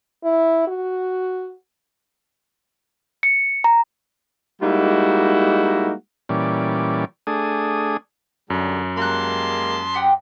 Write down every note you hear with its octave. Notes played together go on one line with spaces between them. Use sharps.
E4
F#4
C#7
A#5
G3 G#3 A#3 D#4 E4 F#4
A#2 E3 G3 C#4 D5
A3 D4 G#4 D#6
F#2 D3 G3
G3 G#3 A#3 A5 A#5 C6 F#6
G4 F#5 G5